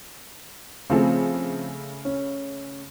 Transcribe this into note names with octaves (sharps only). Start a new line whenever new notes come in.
C#3 F3 A3 C4 G#4
C#4